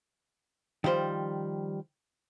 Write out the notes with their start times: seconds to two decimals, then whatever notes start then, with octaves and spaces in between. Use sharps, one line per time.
0.84 D#3 F3 G3 C5